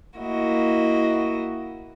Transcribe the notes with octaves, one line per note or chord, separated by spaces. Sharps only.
A#3 E4 F#4 D#5